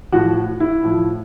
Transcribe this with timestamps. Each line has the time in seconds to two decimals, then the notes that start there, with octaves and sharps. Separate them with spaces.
0.12 A2 F3 F#4
0.60 E4
0.83 A2 F3